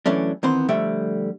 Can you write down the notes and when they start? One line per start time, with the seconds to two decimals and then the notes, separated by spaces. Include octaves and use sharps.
0.06 E3 F#3 A3 C#4 D4
0.43 D#3 E3 B3 C4 C5
0.68 D3 F3 G3 A3 E5 G5